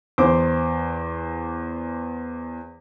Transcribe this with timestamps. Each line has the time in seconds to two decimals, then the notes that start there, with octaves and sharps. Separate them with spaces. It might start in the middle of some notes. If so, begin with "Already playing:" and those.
0.18 E2 C5 D6